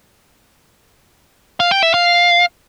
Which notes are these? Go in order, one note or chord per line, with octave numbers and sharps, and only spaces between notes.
F5
G5
E5
F5